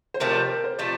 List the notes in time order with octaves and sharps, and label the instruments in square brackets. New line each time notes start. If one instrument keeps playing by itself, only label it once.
[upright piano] C5
[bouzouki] C3 F3 A3 [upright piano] A#4
[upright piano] D5
C5
A#4
C5
[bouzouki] C3 F3 A3 [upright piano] D5